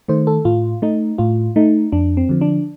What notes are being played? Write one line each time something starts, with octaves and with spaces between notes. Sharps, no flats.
D#3 A3 C5
A4
A2 F4
A3 D#4
A2 F4
A3 D#4
F2 D4
C4
D3 F3
D4